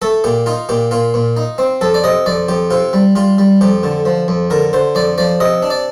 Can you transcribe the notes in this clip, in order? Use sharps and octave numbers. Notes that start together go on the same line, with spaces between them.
A3 A4
A#2 G4
D#4 F4
A#2 G4
A#2 F4
A#2
D#4
C4
F2 A4
D5
C3 D#5
F2 D5
F2 G4
C3 F4
G3
G3 F4
G3
F2 G4
D3
F3
F2
D3 A#4
D3 C5
F2 D5
F3 D5
C3 D#5
D4
D5